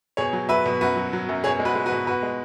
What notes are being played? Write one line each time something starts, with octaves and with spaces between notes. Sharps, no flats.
B2 G#4 C#5
F#3
F#3 B4 E5
B2
F#2 F#4 B4
F#3
F#3
F#2
B2 G#4 C#5
G#3
F#4 B4
G#3
F#4 B4
B2
B2 F#4 B4
G#3